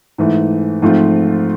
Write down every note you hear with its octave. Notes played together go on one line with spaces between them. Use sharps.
G#2 E3 A3
G#2 F3 A3 C4 F4